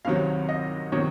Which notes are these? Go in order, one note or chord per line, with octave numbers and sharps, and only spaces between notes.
C2 C3 D#3 F#3 F5
D#5
C3 D#3 F#3 C#5